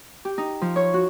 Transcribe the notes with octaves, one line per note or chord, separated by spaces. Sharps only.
G4
D#4
F3
C#5
F#4